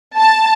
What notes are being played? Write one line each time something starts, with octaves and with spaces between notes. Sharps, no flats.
A5